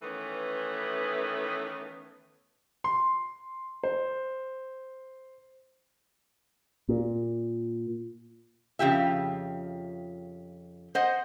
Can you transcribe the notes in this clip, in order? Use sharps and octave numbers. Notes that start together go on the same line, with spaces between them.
D#3 E3 A3 B3 C#4 B4
C6
C5
A#2
F2 C#3 F4 G4 E5
C5 D#5 F#5